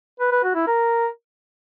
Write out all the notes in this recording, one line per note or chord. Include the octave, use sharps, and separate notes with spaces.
B4
B4
F#4
E4
A#4